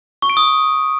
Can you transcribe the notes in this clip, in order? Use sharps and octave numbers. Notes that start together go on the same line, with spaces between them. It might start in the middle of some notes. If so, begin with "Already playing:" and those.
C#6
D7
D#6